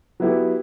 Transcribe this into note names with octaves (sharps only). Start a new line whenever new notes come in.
F#3 B3 E4 G4